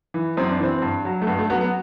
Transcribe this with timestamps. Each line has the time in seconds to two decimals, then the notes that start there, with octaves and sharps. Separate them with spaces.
0.14 E3
0.37 F#2 C4
0.50 D4
0.59 E3 C4
0.82 G2
1.05 F#3
1.22 A3
1.27 G2 B3
1.38 A3
1.50 F#3 B3
1.61 B3